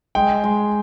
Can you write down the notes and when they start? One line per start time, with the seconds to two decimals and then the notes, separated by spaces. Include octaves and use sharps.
0.15 G#3 G5
0.44 G#3